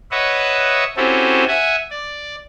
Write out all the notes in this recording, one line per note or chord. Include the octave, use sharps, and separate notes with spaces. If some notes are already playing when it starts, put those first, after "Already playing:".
B4 C#5 D#5 E5 F#5
C4 C#4 E4 F#4 G4 A4
E5 F#5 G#5
D5